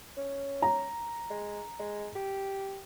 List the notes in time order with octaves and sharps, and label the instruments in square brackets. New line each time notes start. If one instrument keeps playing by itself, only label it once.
[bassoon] C#4
[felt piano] A#5
[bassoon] G#3
G#3
G4